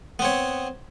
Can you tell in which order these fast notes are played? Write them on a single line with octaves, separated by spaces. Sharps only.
B3 C4 C#5